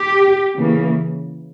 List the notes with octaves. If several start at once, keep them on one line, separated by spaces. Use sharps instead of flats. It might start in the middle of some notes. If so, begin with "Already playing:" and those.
Already playing: G4
C#3 E3 A#3